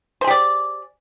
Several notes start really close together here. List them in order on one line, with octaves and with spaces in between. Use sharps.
C5 G#4 G4 D5